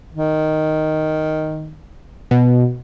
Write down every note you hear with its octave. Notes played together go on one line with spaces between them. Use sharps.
D#3
B2